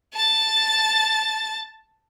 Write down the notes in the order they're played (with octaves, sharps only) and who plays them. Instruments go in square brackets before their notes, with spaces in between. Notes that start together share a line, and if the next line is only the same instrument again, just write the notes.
[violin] A5 A6